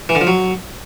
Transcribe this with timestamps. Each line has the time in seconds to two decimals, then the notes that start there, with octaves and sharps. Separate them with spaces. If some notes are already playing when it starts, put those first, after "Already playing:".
0.09 E3
0.15 D3
0.21 F3
0.27 F#3